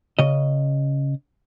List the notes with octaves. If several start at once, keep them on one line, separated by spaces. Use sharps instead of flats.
C#3 D#5